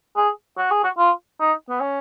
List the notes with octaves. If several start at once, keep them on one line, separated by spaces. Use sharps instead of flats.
G#4
F#4
G#4
F#4
F4
D#4
B3
C#4